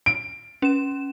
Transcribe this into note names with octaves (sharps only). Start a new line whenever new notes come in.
D7
C#4 E7